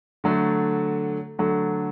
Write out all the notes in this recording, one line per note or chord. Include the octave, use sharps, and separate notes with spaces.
D3 F#3 A3
D3 F#3 A3